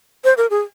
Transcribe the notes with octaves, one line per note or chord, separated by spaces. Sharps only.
C5
A#4
G#4